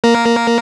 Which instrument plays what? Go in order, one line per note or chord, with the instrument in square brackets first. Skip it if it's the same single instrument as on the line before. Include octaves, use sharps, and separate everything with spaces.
[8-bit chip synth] A#3 A#4